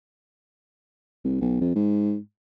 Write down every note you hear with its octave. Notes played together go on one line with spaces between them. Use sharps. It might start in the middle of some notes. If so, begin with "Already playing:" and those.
C2
B1
F2
G#2